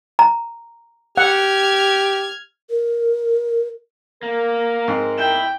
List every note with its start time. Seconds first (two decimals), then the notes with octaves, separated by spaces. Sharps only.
0.19 A#5
1.17 G4 F#5 F6 G#6
2.70 A#4
4.23 A#3 A#4
4.88 G#2 C4
5.18 E4 G5